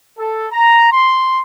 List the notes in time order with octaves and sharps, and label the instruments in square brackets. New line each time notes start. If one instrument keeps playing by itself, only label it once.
[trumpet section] A4
A#5
C6